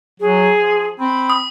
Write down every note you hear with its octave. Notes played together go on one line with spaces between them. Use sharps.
F#3 G#4
F3
C4 B5
D#6